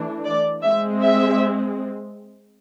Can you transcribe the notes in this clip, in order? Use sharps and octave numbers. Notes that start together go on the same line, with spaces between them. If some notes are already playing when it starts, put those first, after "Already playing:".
Already playing: E3 A3 D4
D5
G#3 C4 E5
E5